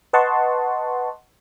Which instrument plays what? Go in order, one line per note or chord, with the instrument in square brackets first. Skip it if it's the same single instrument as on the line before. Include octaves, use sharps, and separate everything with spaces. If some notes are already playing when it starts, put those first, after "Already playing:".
[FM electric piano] B4 D#5 F#5 A5 C6 C#6